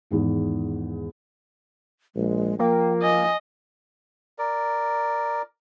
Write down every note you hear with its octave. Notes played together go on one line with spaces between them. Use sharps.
E2 G#2 D#3
A#1 G#3
F3 A#3 G5
D#5 G#5
A#4 D5